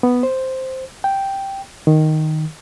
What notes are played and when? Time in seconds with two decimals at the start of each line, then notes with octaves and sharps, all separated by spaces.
0.03 B3
0.23 C5
1.04 G5
1.87 D#3